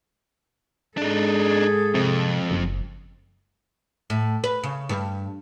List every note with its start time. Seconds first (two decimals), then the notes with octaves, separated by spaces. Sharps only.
0.98 G#2 D4 D#4 G#4 A4
1.94 F2 C3
2.51 F#1
4.10 A2
4.44 B4
4.63 C#3
4.89 G2